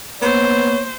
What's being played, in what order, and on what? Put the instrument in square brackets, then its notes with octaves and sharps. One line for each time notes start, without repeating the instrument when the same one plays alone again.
[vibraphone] A#3 [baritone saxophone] B3 [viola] C5 [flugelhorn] C#5